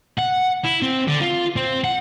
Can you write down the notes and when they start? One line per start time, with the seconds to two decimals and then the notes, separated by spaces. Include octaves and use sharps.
0.19 F#5
0.65 E4
0.82 C4
1.08 D3
1.21 F4
1.56 C4
1.84 F#5